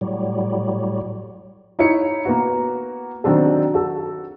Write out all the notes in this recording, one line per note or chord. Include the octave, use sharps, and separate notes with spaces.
A2 F#3 G3
D#4 E4 C#5 C#7
A#3 B3 F#4
D#3 F#3 C4 D4 A4
F#4 A4